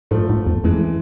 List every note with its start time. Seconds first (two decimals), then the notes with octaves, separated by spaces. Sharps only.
0.11 G#2 F3 A3
0.30 G#2
0.47 E2
0.64 F2 E3 G#3